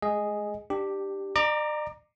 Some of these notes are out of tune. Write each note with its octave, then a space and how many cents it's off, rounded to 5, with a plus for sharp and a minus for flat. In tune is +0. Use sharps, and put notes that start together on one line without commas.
G#3 +35 G#4 +0 D#5 +0
D4 +20 G4 +0
D5 +45 A#5 +0 D6 +10